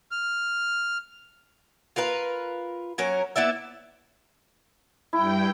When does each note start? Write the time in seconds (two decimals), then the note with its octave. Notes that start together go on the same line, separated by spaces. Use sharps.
0.11 F6
1.96 F4 A#4 B4 F5
2.98 F#3 C#4 A#4
3.36 B3 E4 D5 E5
5.13 G2 E4 G5